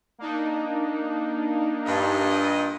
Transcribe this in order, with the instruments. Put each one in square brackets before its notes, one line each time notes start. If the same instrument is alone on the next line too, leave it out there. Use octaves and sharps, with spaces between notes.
[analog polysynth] A#3 D4 D#4
[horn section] G2 A#2 D#5